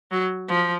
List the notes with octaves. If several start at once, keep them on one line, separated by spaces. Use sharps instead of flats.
F#3
F3